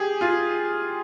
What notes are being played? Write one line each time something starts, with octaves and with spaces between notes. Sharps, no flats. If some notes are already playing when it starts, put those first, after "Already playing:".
Already playing: G4 G#4
F4